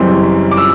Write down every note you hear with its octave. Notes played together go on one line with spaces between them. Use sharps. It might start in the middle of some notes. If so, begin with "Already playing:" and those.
Already playing: F#1 F#2 E3 G3 C4
D6
E6